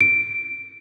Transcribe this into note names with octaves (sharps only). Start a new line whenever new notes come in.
D7